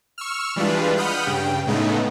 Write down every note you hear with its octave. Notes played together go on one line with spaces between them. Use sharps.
C#6 E6 F6
E3 G3 G#3 D4 F4 B4
F#5 B5 D#6 F6 G6
G2 C#3 G5
A2 C#3 G#3 A3 B3 D#4